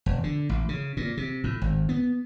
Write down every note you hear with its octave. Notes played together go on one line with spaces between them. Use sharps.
E1
D3
A1
C#3
A#2
C3
A2
G#1
B3